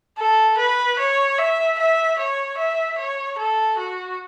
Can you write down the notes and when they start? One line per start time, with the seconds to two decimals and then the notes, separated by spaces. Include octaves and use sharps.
0.18 A4
0.58 B4
0.99 C#5
1.38 E5
1.78 E5
2.18 C#5
2.58 E5
2.98 C#5
3.38 A4
3.78 F#4